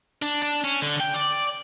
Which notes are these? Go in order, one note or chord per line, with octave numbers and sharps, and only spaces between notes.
D4
D4
C#4
D3
G5
D5